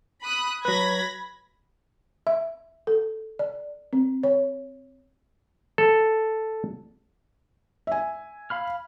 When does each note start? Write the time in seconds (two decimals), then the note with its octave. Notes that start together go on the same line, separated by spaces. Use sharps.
0.23 B5 D#6 F#6
0.65 F#3 B4 B5 G#6 A#6
2.27 E5
2.87 A4
3.39 D5
3.93 C4
4.23 C#5
5.78 A4
7.87 E5 G#5
8.50 F5 B5 F6